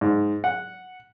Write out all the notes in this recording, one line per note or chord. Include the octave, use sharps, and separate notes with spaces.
G#2
F#5